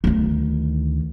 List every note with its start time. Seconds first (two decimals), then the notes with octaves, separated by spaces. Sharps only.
0.04 D2 D#3